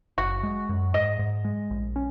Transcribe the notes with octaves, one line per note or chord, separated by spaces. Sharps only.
F#1 F#4
G#3
F#2
G#2 D#5
G#2
G#3
A#1
C#4